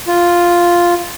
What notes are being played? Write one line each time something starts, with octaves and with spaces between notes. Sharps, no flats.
F4